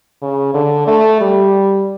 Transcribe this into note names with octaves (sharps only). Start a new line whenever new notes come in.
C#3
D3
A3
G3